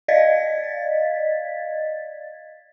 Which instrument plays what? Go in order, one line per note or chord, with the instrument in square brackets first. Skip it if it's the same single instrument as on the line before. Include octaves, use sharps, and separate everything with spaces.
[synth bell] D5 D#5 F5 G#6 A6 B6